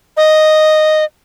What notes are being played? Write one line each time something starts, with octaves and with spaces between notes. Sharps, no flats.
D#5